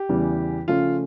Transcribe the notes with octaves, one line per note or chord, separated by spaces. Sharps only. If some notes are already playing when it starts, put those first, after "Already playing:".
Already playing: G4
E2 C#3 E3 G3
C#3 F3 A3 C#4 F4